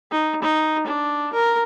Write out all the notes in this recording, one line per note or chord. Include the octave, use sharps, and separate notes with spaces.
D#4
D#4
D4
A#4